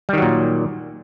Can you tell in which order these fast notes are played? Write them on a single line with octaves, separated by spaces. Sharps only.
G3 D#3 F#3 A#2